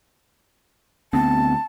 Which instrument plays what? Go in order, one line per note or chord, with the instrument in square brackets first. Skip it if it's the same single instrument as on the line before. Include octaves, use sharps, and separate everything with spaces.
[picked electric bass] D2 B3 C4 [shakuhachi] A5